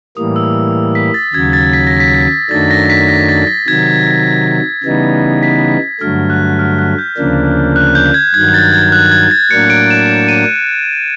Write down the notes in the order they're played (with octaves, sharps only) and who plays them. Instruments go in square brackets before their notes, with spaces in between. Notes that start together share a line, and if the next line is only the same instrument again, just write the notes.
[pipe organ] A2 E3 G3 A#3 [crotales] D#6
[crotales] E6
B6
A6
[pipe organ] D#2 C#3 F#3 [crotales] G#6
[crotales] A6
B6
A#6
B6
[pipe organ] F#2 D#3 F#3 A3 D4 [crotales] A6
[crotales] A#6
B6
A#6
A6
A#6
[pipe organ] C3 D#3 F#3 [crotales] G#6
[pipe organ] C#3 E3 G3 B3 D#4
[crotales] B6
B6
[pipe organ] G2 D3 F#3 A3 [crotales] F6
[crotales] F#6
F6
F#6
G6
[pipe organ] D2 C#3 F3 A#3 D4
[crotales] F#6
G6
G#6
[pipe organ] G2 D#3 F#3 [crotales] G#6
[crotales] A6
G#6
F#6
G#6
A6
[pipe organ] A2 F#3 A#3 D4 [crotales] C#7
[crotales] D7
E7
E7
D#7